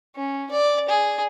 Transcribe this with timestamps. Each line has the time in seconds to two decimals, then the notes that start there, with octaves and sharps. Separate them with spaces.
0.16 C#4
0.51 D5
0.89 G#4